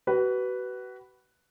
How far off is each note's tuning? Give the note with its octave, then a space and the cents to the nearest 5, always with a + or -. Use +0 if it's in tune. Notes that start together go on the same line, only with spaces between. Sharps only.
F#4 +35 B4 +0